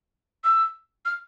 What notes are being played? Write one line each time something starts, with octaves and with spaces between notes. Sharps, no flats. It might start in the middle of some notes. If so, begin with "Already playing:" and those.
E6
F6